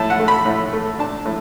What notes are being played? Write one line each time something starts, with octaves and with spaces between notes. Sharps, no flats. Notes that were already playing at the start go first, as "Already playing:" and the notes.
Already playing: A2 A5
F#5
A3
B5
A2
A3
D4 A5
A2